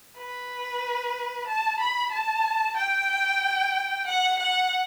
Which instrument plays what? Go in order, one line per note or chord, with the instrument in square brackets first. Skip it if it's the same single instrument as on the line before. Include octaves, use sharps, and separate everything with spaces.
[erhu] B4
A5
B5
A5
G5
F#5
F#5